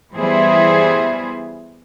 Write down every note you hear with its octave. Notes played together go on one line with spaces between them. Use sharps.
E3 G3 B3 E4 G#4 C5